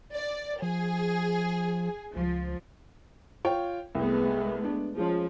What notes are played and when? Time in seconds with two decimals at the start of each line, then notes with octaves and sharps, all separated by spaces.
0.15 D5
0.62 F3 G#4
2.16 C#2 F3
3.45 F4 C#5 G5
3.95 C2 G#3 A3 B3
4.65 D4
4.97 F3 G#3 C#4